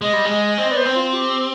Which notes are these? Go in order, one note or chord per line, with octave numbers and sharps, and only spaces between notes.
G#3 D#5
G3
G#3 D#5
C4 D#5
B3 D5
C5
C4
F4
G4